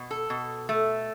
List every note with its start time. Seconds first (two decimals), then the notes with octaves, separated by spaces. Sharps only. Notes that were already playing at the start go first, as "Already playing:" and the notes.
Already playing: B2
0.11 A4
0.30 B2
0.69 A3